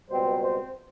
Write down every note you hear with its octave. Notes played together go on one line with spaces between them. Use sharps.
C#2 B2 G3 C4 C5
C4 C5